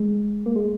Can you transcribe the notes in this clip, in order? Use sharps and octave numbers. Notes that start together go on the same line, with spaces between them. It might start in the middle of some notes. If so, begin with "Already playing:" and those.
Already playing: G#3
A#3
G#3